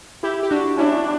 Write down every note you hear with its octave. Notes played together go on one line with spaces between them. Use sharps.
E4 G4
G4
D4 F#4
C#4 D4 E4